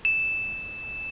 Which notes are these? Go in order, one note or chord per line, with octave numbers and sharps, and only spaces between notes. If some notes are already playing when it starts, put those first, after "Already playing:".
E7